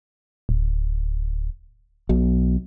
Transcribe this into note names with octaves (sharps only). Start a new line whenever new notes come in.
D1
B1 B2